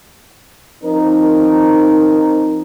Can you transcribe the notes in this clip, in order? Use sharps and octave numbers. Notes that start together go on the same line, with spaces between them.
F3 C4 D#4 A#4